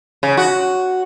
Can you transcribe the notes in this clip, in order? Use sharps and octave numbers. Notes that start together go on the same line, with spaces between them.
C#3
F#4